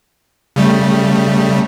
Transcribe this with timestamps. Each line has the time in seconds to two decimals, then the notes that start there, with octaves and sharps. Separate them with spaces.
0.56 C#3 G3 A3